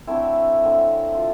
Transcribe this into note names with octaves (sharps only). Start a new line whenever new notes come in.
D3 F#3 A3 C4 E4
D3 F#3 A3 C4
F4